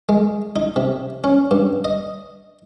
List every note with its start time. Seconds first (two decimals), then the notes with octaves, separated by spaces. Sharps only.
0.09 G#3
0.56 D#4
0.76 C3
1.24 C#4
1.51 G2
1.85 D#5